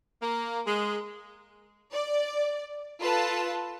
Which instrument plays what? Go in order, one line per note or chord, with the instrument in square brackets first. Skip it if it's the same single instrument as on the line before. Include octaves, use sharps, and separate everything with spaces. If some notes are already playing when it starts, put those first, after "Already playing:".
[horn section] A#3
G#3
[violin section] D5
F4 A4 B4 A5